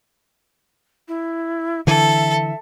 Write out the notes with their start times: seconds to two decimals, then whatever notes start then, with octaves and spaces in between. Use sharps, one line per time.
1.08 E4
1.87 D3 E3 A4 E5